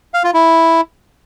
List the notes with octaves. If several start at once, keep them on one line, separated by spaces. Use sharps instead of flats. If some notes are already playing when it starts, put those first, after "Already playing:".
F5
F4
E4